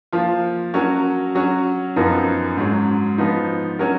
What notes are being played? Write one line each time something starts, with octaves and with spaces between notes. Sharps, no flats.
F3 A#3 F4
F#3 C#4 F#4 A#4
F#3 C#4 F#4
F#2 F3 B3 D#4 A#4
G#2 F#3 C#4
F3 B3 D#4
F#3 C#4 F#4 A#4